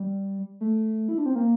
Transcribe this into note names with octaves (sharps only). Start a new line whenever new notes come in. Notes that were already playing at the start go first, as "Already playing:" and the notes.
Already playing: G3
A3
E4
D4
C4
A#3